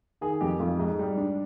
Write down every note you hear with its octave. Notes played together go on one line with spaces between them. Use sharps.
D#3 G#4
F2 G4
F2 F4
G#2 D#5
G3
D4